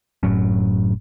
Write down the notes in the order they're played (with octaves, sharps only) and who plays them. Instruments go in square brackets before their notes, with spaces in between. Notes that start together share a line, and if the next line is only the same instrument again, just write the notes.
[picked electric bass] F#1 A2 F#3 C#4